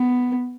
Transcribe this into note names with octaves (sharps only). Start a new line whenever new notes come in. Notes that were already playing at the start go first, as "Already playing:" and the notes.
Already playing: B3